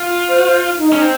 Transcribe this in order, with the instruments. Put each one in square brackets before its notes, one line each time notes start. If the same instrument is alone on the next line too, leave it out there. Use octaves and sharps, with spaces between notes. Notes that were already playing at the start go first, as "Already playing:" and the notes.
Already playing: [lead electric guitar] F4
[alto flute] C5
C5
D#4
[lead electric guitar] C#4 [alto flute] D#4
[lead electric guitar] C4